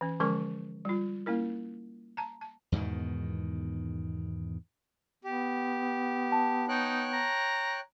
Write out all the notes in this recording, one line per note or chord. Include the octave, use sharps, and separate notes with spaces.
E3 C#4
D3 F3 G#3 C#4 A#4 C#6
G3 F4
A#3 C#4 E4 A#4
A5 A#5
A5
E2 G#2 B2 D#3
B3 G4
A5
D#4 C#5 G5 F#6
A#5